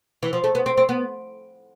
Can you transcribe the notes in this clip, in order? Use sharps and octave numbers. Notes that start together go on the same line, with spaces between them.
E3
F3
A3
B3
C4
C4
B3